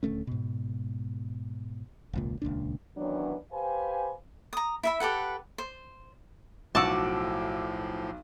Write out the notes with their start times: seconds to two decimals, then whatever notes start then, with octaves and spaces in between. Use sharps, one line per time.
0.03 D#1 D2 A3 C#4
0.27 G#2 B2
2.13 E1 C#2 A#2
2.42 D#1 C#2 A#2 D4
2.96 D#3 E3 F#3 B3 C#4 D4
3.52 G4 B4 C5 F5 G#5
4.53 A#5 D#6
4.83 E4 E5 B5
5.00 G4 A4 B4 F#5
5.58 C5
6.75 B1 A2 F3 F#4 A5 D6 E6